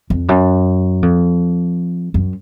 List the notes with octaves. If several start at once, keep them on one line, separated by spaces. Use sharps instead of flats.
F2
F#2
F2
F#2